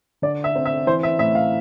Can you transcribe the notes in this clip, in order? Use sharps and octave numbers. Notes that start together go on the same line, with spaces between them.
D3 D5
E5
C4
E5
E3 C5
E5
A2 E5
F5